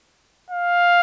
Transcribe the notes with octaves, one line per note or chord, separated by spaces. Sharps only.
F5